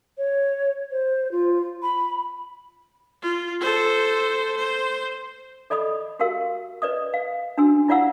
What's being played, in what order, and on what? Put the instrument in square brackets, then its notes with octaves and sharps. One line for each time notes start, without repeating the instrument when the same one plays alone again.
[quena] C#5
C5
F4
B5
[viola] F4
A4 C5
C5
[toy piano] A4 D5 D#5 B5 D#6
F#4 G4 A#4 F5 E6
B4 D5 D#5 D#6
F5
D4 F#4 G#5 E6
E4 F4 D5 F5 F#5 E6